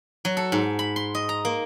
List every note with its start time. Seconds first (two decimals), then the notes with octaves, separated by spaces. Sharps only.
0.25 F#3
0.37 A4
0.52 G#2
0.79 B5
0.96 C6
1.15 D#5
1.29 A#5
1.45 A#3